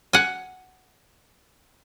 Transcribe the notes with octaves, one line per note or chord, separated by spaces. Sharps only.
F#5 G#5